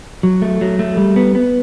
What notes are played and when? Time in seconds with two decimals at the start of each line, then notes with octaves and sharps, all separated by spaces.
0.23 F#3
0.42 A3
0.61 F#3
0.79 A3
0.97 G3
1.16 B3
1.35 B3